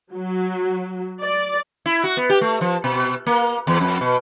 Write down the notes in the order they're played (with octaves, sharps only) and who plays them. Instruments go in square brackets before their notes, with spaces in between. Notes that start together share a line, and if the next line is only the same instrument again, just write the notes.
[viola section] F#3
D5
[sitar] E4
F#4
B3
G4
A3
F3
B2
A#3
E2
F2
B2